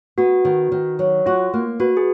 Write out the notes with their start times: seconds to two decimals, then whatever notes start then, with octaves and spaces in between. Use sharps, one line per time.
0.18 B3 F#4
0.45 D#3
0.72 D#3
0.99 F#3
1.26 F4 F#4
1.54 A#3
1.80 F#4 B4
1.97 G#4